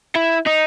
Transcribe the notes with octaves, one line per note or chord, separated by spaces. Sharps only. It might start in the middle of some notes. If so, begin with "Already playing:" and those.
E4
D#4